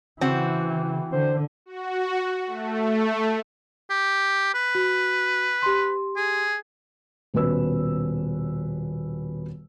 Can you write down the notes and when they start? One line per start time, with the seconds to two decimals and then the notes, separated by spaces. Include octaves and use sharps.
0.21 C#3 E3 C4 F#4
1.12 D3 C5
1.66 F#4
2.47 A3
3.90 G4
4.54 B4
4.75 F#4
5.62 G4 C6
6.16 G#4
7.34 D#1 B2 C#4 B4 E6